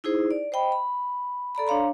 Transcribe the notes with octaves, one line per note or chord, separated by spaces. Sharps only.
D#4 E4 G#4 C5
D5
C5 D#5 G5 B5
B5
A4 D5 A#5 B5
D4 C#5 F5 A#5 C6